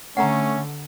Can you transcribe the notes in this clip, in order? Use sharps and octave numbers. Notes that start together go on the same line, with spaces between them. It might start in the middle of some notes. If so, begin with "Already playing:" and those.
D3 A3 C#4 F#5 A#5